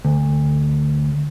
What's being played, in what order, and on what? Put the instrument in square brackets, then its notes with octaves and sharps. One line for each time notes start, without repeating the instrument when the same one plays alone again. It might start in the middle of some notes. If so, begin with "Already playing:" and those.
[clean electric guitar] D2